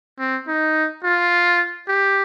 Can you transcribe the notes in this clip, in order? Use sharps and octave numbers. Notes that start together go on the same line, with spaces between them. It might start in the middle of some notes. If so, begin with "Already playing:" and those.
C4
D#4
F4
G4